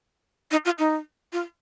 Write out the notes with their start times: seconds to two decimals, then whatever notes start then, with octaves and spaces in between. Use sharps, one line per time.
0.51 D#4
0.65 F4
0.79 D#4
1.33 F4